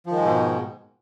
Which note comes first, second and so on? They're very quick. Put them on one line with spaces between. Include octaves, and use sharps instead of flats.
F3 D#3 G#3 G#2 B2